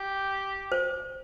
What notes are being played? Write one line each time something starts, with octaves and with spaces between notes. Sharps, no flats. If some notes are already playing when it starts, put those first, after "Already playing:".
Already playing: G4
C5